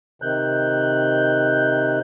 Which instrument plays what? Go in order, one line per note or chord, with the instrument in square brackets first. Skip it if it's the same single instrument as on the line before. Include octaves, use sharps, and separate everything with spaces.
[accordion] C3 D#3 F#6 G6